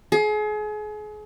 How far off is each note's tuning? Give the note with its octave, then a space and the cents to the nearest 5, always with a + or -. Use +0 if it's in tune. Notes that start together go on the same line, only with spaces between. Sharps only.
G#4 +35